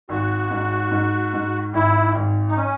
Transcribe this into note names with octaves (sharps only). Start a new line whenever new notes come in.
G#1 F#4
G#2
G#2
G#2
G#1 E4
G#1
D#4
C#4